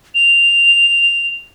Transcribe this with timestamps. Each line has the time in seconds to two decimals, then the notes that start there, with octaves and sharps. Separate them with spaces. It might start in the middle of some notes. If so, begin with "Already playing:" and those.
0.15 F7